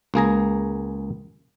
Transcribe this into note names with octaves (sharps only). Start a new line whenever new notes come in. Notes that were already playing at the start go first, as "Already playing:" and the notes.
C#2 A#3 G#4 A#5